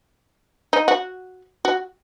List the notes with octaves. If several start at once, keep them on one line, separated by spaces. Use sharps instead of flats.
D#4
F#4
F#4